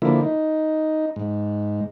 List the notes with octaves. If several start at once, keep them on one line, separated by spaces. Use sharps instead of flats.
D3 F3 A#3 E4
D#4
G#2